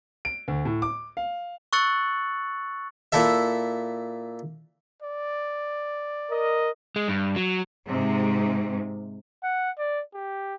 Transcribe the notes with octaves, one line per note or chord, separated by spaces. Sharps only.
D7
D2
A2
D6
F5
C#6 E6 F#6 A6 C#7 F#7
A#2 E4 A4 E5
D5
A#4 D#5
G#3
G2
F#3
G#2 C3
F#5
D5
G4